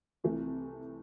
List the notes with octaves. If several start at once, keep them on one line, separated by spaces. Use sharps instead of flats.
C2 C3 E3 A3